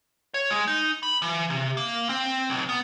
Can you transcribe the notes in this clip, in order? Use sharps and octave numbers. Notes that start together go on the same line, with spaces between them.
C#5
G#3
D#4
B5
E3
C3
A#3
C4
B1
B3